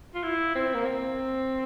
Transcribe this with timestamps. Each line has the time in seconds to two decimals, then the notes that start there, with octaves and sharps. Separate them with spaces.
0.14 F4
0.23 E4
0.55 C4
0.74 A#3
0.85 C4